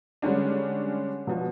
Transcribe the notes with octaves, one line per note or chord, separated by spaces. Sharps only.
D3 G3 G#3 C#4 D4
B2 F3